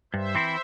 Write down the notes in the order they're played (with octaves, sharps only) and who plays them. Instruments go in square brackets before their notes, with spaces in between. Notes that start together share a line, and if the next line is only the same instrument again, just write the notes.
[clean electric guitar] G2 [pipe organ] C5 E5
[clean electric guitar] E3 C4 E4